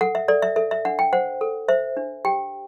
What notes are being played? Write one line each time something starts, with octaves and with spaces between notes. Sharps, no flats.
A4 F#5
E5
A4 D5
E5
A4 E5
E5
D4 F#5
G5
C5 F#5
A4
C5 E5
D4
G4 G5